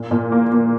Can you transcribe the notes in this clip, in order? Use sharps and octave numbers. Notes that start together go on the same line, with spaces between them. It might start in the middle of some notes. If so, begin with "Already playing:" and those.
Already playing: A#2
A#2
A#3
A#3